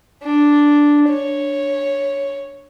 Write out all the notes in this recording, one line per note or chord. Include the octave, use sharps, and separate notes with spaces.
D4
C#5